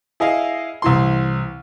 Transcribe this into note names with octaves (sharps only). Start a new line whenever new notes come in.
E4 G#4 D#5 F5
C2 E3 C6